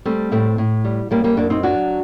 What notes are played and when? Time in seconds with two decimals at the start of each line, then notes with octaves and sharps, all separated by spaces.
0.05 G3 A3 C4
0.32 A2 A3 C4
0.58 A2
0.85 G3
1.11 F#2 G3 A#3
1.24 G3 A#3
1.37 F#2 A#3 D4
1.50 C4 D#4
1.63 F#3 D4 F#4